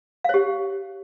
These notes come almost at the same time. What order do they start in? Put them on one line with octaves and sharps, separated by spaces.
F5 C#5 G4